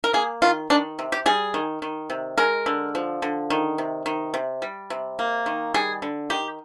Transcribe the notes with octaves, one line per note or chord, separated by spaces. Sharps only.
A#4
A#3 G#4
D#3 F4
D#3 D4
C3
G4
G3 G#4
D#3
D#3
C3
G#3 A#4
D3
F3
D3
D#3
C3
D#3
C3
G3
C3
A#3
D#3
G3 G#4
D3
D#3 G4